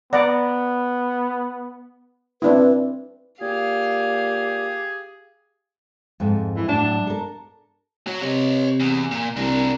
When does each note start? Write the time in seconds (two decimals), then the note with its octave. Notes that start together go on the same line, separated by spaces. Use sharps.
0.13 B3 D5 F#5 A#5
2.42 C4 D4 E4 B4
3.41 A#2 G4 G#4 F5
6.20 F2 G#2
6.56 E3
6.68 A2 F#3 D4
7.07 A4 A#4
8.07 F#4 C#5
8.22 C3 C#5 D#5
8.80 E2
9.11 A#2
9.36 C2 D4 A#4